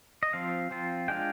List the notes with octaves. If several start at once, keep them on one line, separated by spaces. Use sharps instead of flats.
D#5
F3 C4 F4 F5
F3 C4 F4
G#3 D4 F4 G5